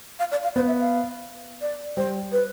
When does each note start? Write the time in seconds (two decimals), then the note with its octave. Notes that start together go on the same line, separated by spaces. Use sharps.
0.19 F5
0.31 D5
0.43 F5
0.56 B3 C5
0.67 E5
0.79 F5
1.61 D5
1.97 G3 C5
2.32 B4